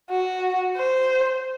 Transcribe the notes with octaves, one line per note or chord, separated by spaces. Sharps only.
F#4
C5